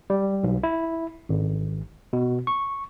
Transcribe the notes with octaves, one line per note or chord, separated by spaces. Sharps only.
G3
B1
E4
G#1
B2
C#6